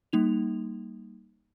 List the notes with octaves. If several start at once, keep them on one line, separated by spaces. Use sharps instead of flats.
G3 A#3 D#4 F7